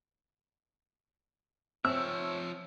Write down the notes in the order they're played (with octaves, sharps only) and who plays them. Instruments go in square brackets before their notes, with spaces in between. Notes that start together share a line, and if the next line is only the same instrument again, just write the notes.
[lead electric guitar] F3 E5 [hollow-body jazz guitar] C4 [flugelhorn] C#5 [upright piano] E6